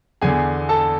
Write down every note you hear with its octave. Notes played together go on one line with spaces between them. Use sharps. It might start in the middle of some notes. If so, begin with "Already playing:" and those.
E2 D3 G#4 G#5
A4 A5